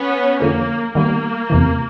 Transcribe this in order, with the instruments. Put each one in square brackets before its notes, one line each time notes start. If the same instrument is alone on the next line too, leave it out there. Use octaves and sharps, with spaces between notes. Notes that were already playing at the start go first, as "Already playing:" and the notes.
Already playing: [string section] B3 C#4
[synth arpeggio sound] F2 D3 F3 [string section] A#3
[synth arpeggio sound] D#3 G3 B3 [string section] A#3
[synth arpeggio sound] E2 C3 E3